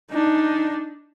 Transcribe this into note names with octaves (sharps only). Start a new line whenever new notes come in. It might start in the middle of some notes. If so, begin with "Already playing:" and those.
D4 D#4